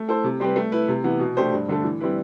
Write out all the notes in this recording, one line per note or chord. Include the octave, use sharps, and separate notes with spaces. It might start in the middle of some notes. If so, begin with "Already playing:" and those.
Already playing: A3
E4 A4 C5
C3
G3 C4 G4 B4
A3
E4 B4
C3
E3 B3 E4
B2
A3 D4 G4 C5
G2
D3 A3 D4 A4
E3
G3 C4 E4 B4